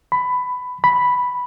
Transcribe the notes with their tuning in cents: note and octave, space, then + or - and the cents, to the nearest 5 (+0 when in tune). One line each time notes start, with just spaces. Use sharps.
B5 +15
B5 +0